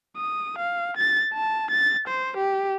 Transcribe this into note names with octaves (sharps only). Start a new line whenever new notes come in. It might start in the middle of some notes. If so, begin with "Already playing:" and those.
D#6
F5
A6
A5
A6
C5
G4